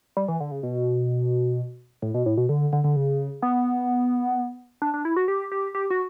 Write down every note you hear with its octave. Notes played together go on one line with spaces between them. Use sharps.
G3
E3
D3
C#3
B2
A2
B2
A2
B2
D3
D3
D3
C#3
B3
D4
D4
E4
F#4
G4
G4
G4
F#4